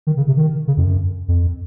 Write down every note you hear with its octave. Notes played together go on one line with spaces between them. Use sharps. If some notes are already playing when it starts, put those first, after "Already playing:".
D#3
C#3
C3
D#3
C#3
F2
F#2
F2